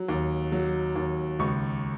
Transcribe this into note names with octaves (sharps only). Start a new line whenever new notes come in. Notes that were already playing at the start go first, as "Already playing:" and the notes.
Already playing: F#3
D#2
F#3
D#2
C#2 C#6